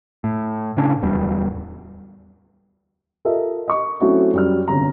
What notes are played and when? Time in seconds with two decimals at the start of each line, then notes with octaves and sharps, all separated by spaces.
0.24 A2
0.77 A2 C#3 C#4 D4
1.02 D1 E2 G3
3.25 F4 A4 A#4 D#5 E5
3.68 D#5 C#6
4.01 F#3 A3 C4 C#4 E4 F#4
4.33 F#2 G3 F6
4.68 G1 C3 C#4 A#5